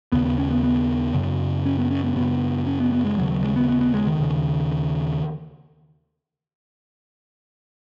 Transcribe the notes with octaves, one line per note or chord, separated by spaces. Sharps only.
D#2 C#3 B3
B3
C#4
B3
B3
F#2 C#3
C#4
B3
C#4
B3
F#2 C#3 B3
C#4
B3
B3
G#3
D#2 C#3 F#3
F#3
G#3
B3
B3
B3
G#3
D#3
D#2 C#3